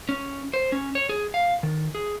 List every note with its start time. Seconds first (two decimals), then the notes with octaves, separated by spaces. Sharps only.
0.09 C#4
0.54 C5
0.72 C#4
0.95 C#5
1.09 G#4
1.34 F5
1.63 D#3
1.95 G#4